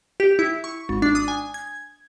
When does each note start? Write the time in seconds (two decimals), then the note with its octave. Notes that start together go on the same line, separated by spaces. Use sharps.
0.20 G4
0.39 E4
0.64 C#6
0.89 G#1
1.02 D4
1.15 D#6
1.28 G#5
1.54 G#6